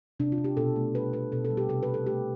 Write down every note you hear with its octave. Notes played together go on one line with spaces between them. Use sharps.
C3 D4
F4
C3
G4
B2 A4
A3
G3 B4
B2 B4
B2 A4
A4
G3
G4
C3 A4
B4
C3
A4
A3 G4